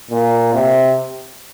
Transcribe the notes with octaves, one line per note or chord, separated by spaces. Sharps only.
A#2
C3